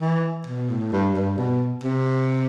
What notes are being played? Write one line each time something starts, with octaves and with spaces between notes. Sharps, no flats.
E3
B2
A2
G2
G2
B2
C3